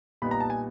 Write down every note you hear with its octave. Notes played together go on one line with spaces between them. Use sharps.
A#2 G3 B3 D#4 B5
A#5
A5
G#5